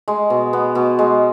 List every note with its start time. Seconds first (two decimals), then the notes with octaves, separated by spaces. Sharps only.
0.08 G#3
0.30 B2
0.53 B3
0.75 B2
0.99 G#3